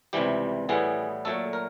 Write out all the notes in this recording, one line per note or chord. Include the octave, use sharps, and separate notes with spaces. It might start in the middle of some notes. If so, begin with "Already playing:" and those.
C#2 C3 E3 G3 G4
A2 E3 G3 B3 G#4
A#2 F#3 A3 A4
A#4